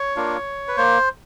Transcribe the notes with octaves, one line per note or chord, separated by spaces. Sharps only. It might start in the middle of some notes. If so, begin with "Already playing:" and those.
Already playing: C#5
A#3 D4 F4
B4
A#3 C5